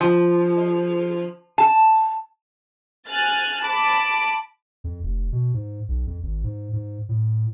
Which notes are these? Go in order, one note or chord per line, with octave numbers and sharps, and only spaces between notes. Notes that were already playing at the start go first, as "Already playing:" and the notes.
F3
A5
G#5 F6 F#6 A6
A5 B5 D6
F2
F1
B2
G#2
B1
F2
G#1
G#2
G#2
A2